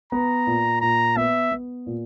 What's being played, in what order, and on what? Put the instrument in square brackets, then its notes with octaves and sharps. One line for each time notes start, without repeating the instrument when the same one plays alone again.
[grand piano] B3 [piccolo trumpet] A#5
[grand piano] A#2
[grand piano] A#2 [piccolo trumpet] A#5
[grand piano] B3 [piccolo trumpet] E5
[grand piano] B3
A#2